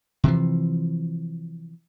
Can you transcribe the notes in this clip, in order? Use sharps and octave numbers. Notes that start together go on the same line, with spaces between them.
C3 E3 F3